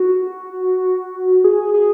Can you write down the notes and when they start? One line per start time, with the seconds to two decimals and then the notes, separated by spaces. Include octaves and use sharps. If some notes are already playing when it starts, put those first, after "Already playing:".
Already playing: F#4
1.44 G#4
1.74 G#4